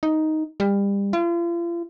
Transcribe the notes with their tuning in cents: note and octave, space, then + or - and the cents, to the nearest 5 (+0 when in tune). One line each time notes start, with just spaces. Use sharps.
D#4 +5
G3 +30
F4 -40